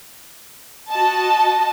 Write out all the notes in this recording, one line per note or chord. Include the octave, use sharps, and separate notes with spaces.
F#4 D#5 A5